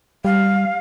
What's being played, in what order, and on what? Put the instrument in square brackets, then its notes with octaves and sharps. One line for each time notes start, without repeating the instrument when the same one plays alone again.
[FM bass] G3 [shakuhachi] F5